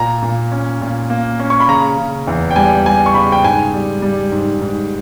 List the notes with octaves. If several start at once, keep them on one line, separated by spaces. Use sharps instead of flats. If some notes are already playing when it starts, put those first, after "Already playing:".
Already playing: A#2 A#5
A#2
C#4
A#2
A#3
C#4
C#6
B5
C#3 A#5
C#3
E2
G5
G3 G#5
G3 G#5
C#6
C#3 B5
G5
G#2 G#5
G3
G3
G#2
G#2